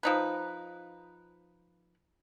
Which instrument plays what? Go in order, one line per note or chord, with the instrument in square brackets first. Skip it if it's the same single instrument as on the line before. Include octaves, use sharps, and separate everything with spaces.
[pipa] F3 D#4 B4